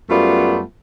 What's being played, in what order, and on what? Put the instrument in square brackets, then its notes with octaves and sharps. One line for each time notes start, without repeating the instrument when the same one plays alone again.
[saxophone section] F#2 G3 A3 B3 F4